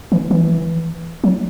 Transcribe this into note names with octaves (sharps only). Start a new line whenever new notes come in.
E3
E3
F#3